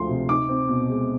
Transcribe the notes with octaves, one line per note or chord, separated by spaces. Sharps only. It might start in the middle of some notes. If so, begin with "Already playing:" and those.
Already playing: D2 F3 G#3 C6
C3
D#4 D6
C4
B2
G#3